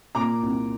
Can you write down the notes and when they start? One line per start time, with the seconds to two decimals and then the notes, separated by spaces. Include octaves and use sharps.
0.15 A#2 A#5 D6
0.43 C2